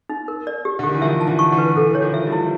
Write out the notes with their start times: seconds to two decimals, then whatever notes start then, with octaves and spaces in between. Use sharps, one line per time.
0.09 D#4
0.28 A#4
0.47 D5
0.65 G4
0.79 D3
0.83 D#3 G4
0.94 E3
1.02 D#3 F3 E5
1.21 A5
1.27 D3 E3
1.39 C#6
1.52 D3 E3
1.58 B4
1.76 D3 E3 A4
1.93 E3 C#5
2.01 D#3 F3
2.14 E5
2.26 F3 G3
2.32 E4